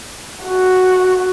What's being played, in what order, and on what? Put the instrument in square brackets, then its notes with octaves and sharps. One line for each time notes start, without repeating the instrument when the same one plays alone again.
[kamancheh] F#4